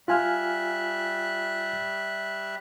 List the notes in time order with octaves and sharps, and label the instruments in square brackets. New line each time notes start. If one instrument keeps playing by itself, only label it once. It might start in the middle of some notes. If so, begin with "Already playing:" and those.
[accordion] G3 E5 F#6 [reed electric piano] F4 G#5 F6